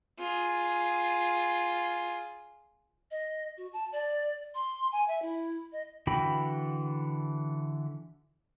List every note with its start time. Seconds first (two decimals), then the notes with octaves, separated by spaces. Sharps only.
0.18 F4 G#4
3.11 D#5
3.57 F#4
3.73 A5
3.92 D5
4.55 C6
4.92 G#5
5.08 E5
5.22 E4
5.72 D#5
6.07 D3 E3 F#4 G5 B5